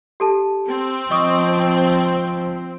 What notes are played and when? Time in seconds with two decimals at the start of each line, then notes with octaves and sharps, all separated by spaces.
0.20 G4 A4 A5
0.69 C4
1.11 F3 D#5 C#6 D#6